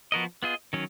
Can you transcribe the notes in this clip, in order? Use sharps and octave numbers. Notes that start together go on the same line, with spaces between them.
F3 B3 F#4 A#4 D#5
B3 F4 G#4 D#5
D#3 F#3 C#4